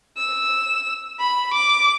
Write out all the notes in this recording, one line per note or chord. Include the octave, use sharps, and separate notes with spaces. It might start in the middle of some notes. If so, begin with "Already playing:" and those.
E6
B5
D6